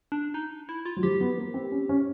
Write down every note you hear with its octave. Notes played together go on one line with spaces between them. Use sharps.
D4
D#4
E4
F4
F#3
F3 G4
B3
A#3
C4
C#4
C#4